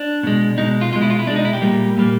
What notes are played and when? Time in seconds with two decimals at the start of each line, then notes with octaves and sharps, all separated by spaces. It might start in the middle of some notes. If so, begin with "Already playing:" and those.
Already playing: D4
0.23 B2 G#3
0.58 B2 G#3 D#4
0.81 F4
0.93 B2 G#3 F4
1.02 E4
1.10 F4
1.19 E4
1.27 B2 G#3 D4
1.36 D#4
1.45 E4
1.53 G4
1.62 A#2 G3 A#3
1.97 A#2 G3 A#3